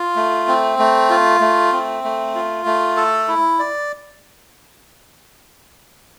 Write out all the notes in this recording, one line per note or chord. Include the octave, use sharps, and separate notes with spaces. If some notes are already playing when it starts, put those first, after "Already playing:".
Already playing: F4
A3
C4
A3
F4
A3
C4
A3
F4
A3
A4
E4
D5